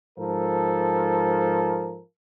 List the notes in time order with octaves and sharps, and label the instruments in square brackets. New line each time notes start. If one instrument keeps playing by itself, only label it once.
[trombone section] G#2 F3 A4 A#4